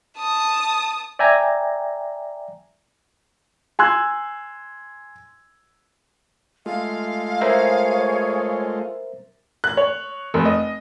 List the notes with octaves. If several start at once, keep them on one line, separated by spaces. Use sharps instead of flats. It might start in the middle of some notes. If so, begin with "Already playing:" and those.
A5 D#6
D5 E5 G5 G#5 A#5
G#5 C6 E6 F#6 G#6
G#3 A3 F4 F5
G#4 A#4 C5 C#5 E5
F#6
C#5
F1
D#5